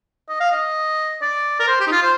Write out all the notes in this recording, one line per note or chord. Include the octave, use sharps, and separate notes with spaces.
D#5
F5
D#5
D5
A#4
C5
G4
D#4
F4
C5